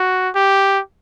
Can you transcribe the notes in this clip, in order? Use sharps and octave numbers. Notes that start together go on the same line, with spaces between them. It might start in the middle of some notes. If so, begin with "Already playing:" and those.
Already playing: F#4
G4